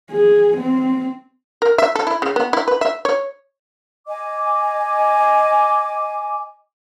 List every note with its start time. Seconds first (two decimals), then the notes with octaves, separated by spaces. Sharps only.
0.12 G#4
0.56 C4
1.62 A#4
1.78 E5
1.95 A4
2.07 E4
2.22 C#3
2.36 B3
2.53 E4
2.68 B4
2.81 E5
3.05 C#5
4.06 D#5 G#5 D6